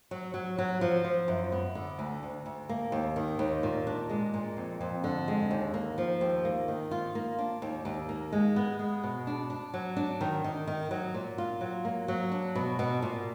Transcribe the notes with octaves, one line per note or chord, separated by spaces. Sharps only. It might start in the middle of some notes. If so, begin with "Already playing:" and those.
F#3
F#3
F#3
F3
F3
F#2
B3
D3
D2
D2
D2
A#3
D#2
D#3
D#2
A#2
D4
G#3
A#2
F2
F2
D3
G#3
D#2
A#3
F3
D#2
A#3
D#3
F4
A#3
D4
D#2
D#2
A#3
G#3
B3
G#3
B2
D4
D4
F#3
D4
D#3
D#3
D#3
F#3
A#2
F4
F#3
A#3
F#3
D4
B2
B2
A#2